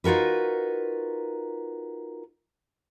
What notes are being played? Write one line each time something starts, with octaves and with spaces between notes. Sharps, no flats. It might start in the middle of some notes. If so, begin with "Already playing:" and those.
D#4 F4 F#4 A#4 B4